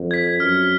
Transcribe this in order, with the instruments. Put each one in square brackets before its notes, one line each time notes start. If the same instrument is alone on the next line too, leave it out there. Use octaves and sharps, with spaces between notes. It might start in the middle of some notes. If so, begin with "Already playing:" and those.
Already playing: [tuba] F2
[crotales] G#6 B6
[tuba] F#2 [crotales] F6